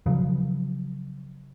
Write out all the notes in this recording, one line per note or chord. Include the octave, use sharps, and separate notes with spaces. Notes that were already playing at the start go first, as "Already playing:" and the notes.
C#3 F3 F#3